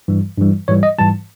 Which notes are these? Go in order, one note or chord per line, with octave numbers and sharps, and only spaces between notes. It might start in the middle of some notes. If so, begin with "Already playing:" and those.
G2 E3 G3
G2 E3 G3
G#2 E3 G3 C#5
D#5
G#2 E3 G3 A5